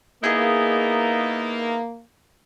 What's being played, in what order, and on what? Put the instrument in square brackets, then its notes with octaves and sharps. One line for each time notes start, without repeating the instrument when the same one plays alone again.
[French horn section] A#3 [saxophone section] B3 D#4 E4 [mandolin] G#4 D#5